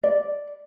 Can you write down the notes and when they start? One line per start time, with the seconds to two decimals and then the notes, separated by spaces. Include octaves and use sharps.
0.03 D5